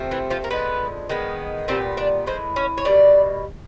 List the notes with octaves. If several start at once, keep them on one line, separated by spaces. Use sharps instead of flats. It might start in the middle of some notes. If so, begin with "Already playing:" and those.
Already playing: C3 F3 A3 C4
E3 E4
F3 F4
A#4
D3 F3 G#3 B3 B4
D#3 G#3 B3
A#2 G3 B3 C4 C5
D4 D5
A2 E3 G#3 C5
C#4 C#5
C#5
B2 G3 A#3 D5